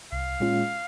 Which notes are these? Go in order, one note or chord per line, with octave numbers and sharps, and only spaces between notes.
C2 F5
A#2 G#3 C#4 F4